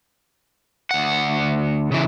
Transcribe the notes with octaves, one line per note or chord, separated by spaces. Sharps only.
D2 F#5
C#3 E3